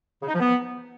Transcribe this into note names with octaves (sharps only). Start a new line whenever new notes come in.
C#3
D#4
F3
B3